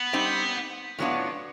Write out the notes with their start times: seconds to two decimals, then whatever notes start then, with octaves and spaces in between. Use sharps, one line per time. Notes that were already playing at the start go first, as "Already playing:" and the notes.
Already playing: B3
0.13 G3 C4 D#4
0.99 A2 F#3 B3 D4 F4